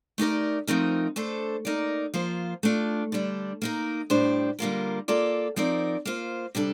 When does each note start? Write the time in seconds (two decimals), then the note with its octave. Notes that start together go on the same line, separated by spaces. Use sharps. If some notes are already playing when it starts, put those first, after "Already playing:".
0.18 A3 D#4 G4 A#4 D5
0.67 F3 A3 C4 D#4 A#4
1.16 A3 D4 A4 C5
1.65 A#3 D#4 A#4 D5
2.14 F3 A#3 F4 C5
2.63 A3 D4 F4
3.12 D3 G3 D4
3.62 A#3 D#4 A#4
4.10 A2 G3 D4 G4 C5
4.59 D3 G3 A#3 F4 A#4
5.08 A#3 F4 A4 D5
5.56 F3 C4 D#4 A#4 D5
6.05 A#3 F4 C5
6.55 C3 G3 D4 A4